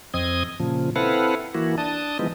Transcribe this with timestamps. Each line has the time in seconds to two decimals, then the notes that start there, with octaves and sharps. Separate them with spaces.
0.14 F2 C4 D#5 D#6 G#6
0.60 A#2 C#3 F3
0.96 C4 E4 A4 B4 F5 F#5
1.55 E3 A#3 E4 F#4
1.78 D4 A5 D#6
2.19 E3 F3 G#3 B3 D#4